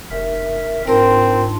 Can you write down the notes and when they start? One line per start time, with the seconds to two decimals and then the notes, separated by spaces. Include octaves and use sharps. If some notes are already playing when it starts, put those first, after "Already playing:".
0.10 F1 A#4 E5
0.87 G#2 C4 D4 F4 A#4